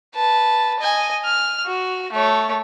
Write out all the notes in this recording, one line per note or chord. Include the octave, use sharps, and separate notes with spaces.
B4 A5
D#5 G#5
F6
F#4
A3 C#5